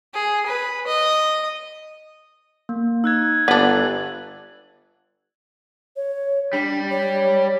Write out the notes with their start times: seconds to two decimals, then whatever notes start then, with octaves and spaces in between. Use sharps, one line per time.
0.14 G#4
0.46 B4
0.87 D#5
2.69 A#3
3.04 D#4 E6 F#6 G#6
3.48 G1 B3 D4 D5 F#7
5.96 C#5
6.53 G3 D4
6.90 C#5